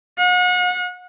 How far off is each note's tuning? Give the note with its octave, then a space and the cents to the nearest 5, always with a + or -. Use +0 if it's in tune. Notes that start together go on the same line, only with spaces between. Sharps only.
F#5 -40